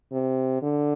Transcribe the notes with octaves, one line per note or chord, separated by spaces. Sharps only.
C3
D3